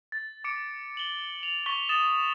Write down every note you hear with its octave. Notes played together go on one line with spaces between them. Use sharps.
A6
D6 C#7 D7
F#7 G7
F7
C#6 A6 B6 G7
D#6 A6 E7